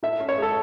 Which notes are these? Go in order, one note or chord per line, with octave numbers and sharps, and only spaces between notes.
A2 E5
C#4
C#5
G#3 A4